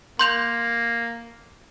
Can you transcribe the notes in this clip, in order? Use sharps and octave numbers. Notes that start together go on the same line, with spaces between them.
A#3 C6 G6 F7